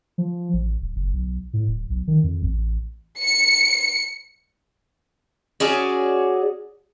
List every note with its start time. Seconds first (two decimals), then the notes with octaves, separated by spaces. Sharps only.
0.18 F3
0.54 A1
0.81 D1
0.96 F#1
1.13 B1
1.53 A2
1.68 D1
1.90 B1
2.08 D#3
2.24 F2
2.43 A1
3.21 C#7
5.60 C#4 F#4 G#4 D5